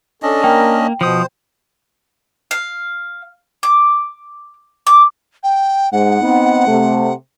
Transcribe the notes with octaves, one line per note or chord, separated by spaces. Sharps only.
C#4 D4 A4 D#5
A#3 A#4 G5
B2 F3 C5 D#6
F5
D6
D6
G5
G#2 F#5
B3 C4 D#4
C3 A3